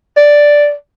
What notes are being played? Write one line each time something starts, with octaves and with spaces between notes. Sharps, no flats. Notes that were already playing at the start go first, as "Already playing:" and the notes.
D5